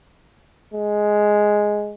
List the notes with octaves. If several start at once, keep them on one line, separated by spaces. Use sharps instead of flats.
G#3